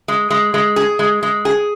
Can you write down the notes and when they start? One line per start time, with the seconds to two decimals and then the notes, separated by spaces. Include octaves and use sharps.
0.08 G#3
0.31 G#3
0.54 G#3
0.76 G#4
0.99 G#3
1.23 G#3
1.45 G#4